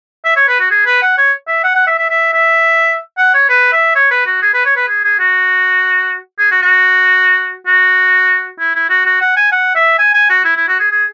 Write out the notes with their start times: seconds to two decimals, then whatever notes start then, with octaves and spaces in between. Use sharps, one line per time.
0.25 E5
0.36 C#5
0.48 B4
0.60 F#4
0.71 G#4
0.86 B4
1.02 F#5
1.18 C#5
1.48 E5
1.64 F#5
1.75 F#5
1.87 E5
1.98 E5
2.10 E5
2.34 E5
3.18 F#5
3.34 C#5
3.49 B4
3.72 E5
3.95 C#5
4.11 B4
4.26 F#4
4.42 G#4
4.54 B4
4.65 C#5
4.76 B4
4.88 G#4
5.04 G#4
5.19 F#4
6.39 G#4
6.51 F#4
6.62 F#4
7.67 F#4
8.59 E4
8.75 E4
8.90 F#4
9.05 F#4
9.21 F#5
9.36 G#5
9.52 F#5
9.76 E5
9.98 G#5
10.14 G#5
10.30 F#4
10.45 E4
10.57 E4
10.68 F#4
10.79 G#4
10.91 G#4